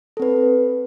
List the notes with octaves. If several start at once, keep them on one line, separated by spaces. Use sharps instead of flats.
C4 A4 B4